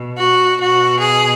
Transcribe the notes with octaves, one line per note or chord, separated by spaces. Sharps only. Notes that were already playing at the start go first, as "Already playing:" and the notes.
Already playing: B2
F#4
B2 F#4
G#4